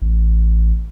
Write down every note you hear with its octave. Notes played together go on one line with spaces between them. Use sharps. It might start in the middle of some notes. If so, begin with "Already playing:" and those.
A1